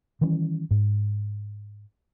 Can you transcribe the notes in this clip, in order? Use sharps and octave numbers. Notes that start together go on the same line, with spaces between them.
D#3 E3 G3 C#4
G#2